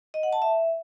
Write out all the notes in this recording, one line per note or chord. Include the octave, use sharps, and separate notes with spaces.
D#5
F#5
A5
E5